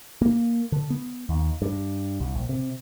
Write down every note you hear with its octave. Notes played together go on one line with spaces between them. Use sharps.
A#3
D3
B3
D#2
G2
C2
A#1
C3